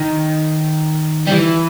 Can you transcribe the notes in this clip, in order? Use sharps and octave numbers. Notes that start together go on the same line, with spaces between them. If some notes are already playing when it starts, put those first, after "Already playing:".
Already playing: D#3
G3
E3